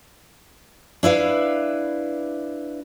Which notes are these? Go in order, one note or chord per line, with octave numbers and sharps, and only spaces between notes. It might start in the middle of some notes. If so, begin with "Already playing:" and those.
D4 E4 B4 F5